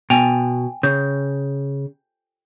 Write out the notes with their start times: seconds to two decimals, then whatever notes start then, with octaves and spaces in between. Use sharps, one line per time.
0.10 B2 G5 G#5 F7
0.83 C#3 G6